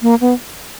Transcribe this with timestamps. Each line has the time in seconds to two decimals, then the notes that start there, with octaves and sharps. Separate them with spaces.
0.02 A#3
0.21 B3